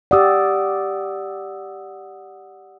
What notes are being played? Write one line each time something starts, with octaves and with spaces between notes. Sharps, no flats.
G4 D5 F#5 D#6 E6